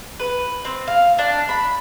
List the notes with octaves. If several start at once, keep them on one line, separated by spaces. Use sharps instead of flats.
B4
C4
F5
D4
B5